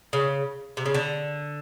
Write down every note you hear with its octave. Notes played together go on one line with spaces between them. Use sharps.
C#3
C3
C#3
D3